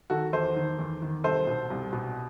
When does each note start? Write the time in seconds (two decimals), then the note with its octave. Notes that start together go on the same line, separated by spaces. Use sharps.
0.10 D#3 F#4 A4
0.33 E2 A4 C5
0.56 D#3
0.79 E2
1.02 D#3
1.24 C2 A4 C5
1.47 B2
1.70 C2
1.93 B2